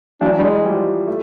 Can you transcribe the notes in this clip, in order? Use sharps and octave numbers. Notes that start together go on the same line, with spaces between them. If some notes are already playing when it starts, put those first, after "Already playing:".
E3 F#3 D4
G3
G#3
F3 G3
A3